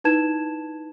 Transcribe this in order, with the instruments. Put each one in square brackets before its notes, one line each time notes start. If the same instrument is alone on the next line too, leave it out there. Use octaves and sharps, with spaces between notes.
[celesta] D#4 E4 B4 A5 G#6 E7